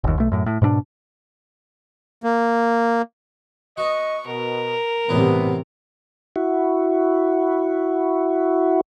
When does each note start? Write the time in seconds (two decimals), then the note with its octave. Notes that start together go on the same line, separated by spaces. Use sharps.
0.04 G1 D#2
0.18 B1 A3
0.32 F#2 A2
0.46 A2
0.62 G#2 B2 A3 D4
2.24 A#3
3.78 B3 F#4 D#5 C#6
4.27 B2 A#4
5.09 F#2 A2 C3 E3 G3 B3
6.36 E4 F#4